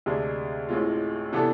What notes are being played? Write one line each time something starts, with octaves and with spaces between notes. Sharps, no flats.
D2 C3 G#3 D4 G#4
A1 A2 G#3 C4 F4
C3 E3 B3 D4 A4